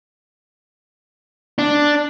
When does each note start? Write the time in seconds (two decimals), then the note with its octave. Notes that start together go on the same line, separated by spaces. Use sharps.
1.59 D4